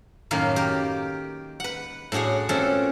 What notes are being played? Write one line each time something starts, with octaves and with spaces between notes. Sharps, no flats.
F#2 A2 D#3 A#3 A#4 F5
G4 A#4
B4 F#5
A2 D4 F#4 G#4 C#5
A#2 A3 C4 C#4 F#4 A4